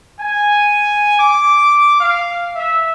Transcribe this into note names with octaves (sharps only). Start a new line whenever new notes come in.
G#5
D6
F5
E5